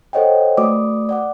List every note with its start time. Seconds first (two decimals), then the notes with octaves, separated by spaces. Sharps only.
0.13 A4 C5 C#5 D#5 F#5 G5
0.57 A3 F#4 B4 D5 D6 D#6
1.09 D5 F#5 D6